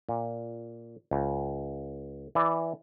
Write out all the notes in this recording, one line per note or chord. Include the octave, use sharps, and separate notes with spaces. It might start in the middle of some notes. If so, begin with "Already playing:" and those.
A#2
C#2
E3 D5